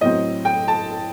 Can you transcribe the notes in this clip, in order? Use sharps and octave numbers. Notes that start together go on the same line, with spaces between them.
A2 F#3 C4 D#5
G5
A5